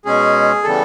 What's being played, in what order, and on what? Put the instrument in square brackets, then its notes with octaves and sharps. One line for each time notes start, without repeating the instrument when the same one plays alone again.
[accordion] B2 G#3 C#4 G#4
C#3 E3 G3 B3 A4